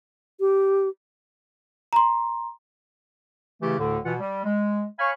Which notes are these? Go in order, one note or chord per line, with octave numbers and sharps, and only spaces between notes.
G4
A#5 C6
C#3 E3 A3 E4 G4
D2 A2 D3
B2 E3 F4 F#5
G3
G#3
C#5 F5 G#5 B5 C#6